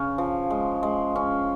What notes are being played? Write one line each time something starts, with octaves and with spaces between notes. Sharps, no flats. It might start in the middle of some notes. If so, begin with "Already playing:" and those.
Already playing: C#3 C#4
F3
G#3
G#3
C#4